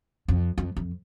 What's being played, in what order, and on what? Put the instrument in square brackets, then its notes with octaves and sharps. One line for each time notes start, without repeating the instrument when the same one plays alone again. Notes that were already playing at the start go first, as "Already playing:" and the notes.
[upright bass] F2
F2
F2